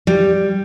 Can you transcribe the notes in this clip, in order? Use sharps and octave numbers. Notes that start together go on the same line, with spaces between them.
G3